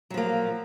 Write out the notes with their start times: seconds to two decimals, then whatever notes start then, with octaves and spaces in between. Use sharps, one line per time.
0.10 F#3
0.14 F3
0.17 A#3